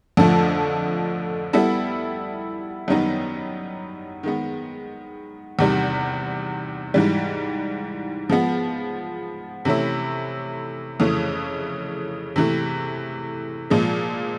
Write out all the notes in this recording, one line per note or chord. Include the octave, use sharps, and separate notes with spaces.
F2 D3 F3 A3
G3 B3 E4 A4
F#2 D#3 G3 B3 D#4
D#3 G#3 B3
E2 C3 D#3 G3
G#2 E3 G3
F3 G#3 B3
C3 E3 A3 C#4 E4
F2 C#3 E3 A3
C3 E3 A3
A#2 F3 G#3